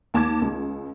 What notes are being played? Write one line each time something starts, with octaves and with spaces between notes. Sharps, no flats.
D#2 A5 D6 G#6
C#2